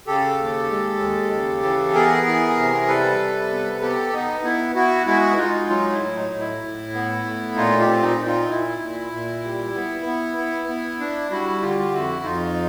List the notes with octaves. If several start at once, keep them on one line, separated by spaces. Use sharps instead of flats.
C#3 G4 A4
D#2
G#3
D#2
C#3
E3
B3 G#4 A#4
E3
C3
G3 A4 B4
C3
B3
B3 G4 A4
B3 D#4
B3 E4
B3 E4 F#4
G#3 E4 F#4
G#3 D#4 F4
F#3 D#4 F4
E4
A2
D#4
A2
E4
A2
B3
A2
A#2 D#4 F4
F4 G4
C4
D#4
A#2
D#4 F4
A#2 E4
A#2
A#2
G3
B3
B3
B3
B3
D4
G3 E4 F#4
D3 F4 G4
F2 E4 F#4
F2 D#4 F4